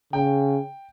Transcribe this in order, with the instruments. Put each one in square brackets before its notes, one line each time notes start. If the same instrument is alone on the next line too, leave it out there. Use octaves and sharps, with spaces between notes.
[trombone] C#3 [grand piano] G5